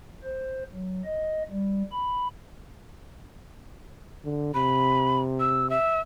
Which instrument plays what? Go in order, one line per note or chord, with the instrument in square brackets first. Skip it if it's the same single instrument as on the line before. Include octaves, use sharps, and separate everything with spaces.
[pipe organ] C5
F#3
D#5
G3
B5
[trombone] D3
[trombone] C3 [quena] B5
[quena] E6
E5